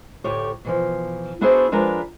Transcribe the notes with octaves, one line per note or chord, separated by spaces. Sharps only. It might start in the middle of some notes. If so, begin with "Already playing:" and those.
D2 A2 G4 C#5
B2 E3 F3
B3 D4 E4 F#4 G#4 C5
F3 G#3 D4 A#4 B4 A#5